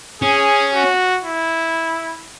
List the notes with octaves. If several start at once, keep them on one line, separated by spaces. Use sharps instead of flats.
C#4 G#4
F#4
E4